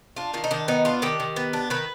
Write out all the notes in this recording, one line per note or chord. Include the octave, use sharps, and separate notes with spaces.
D4 F4
D#3 F4
D#4
D#3 D4
B3 D#4
D4 F4
D#3 G4
D#3
B3
D4
D#3 B4